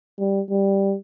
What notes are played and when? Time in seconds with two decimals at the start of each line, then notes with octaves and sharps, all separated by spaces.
0.18 G3
0.50 G3